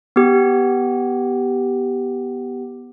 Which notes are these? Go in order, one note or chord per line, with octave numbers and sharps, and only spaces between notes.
B3 G4